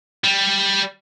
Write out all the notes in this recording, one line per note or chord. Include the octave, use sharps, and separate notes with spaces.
G3